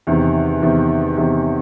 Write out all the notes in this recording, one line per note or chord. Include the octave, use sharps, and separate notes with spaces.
E2 C3 D#3
E2 C3 D#3
E2 C3 D#3